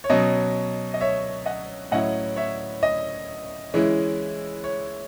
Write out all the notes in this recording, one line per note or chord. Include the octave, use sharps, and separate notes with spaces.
C#5
B2 F#3 C#4 D#5
D#5
C#5 E5
D#5 F#5
A2 F#3 C#4 E4 D#5 F#5
C#5 E5
D#5
E3 G#3 C#4 E4
C#5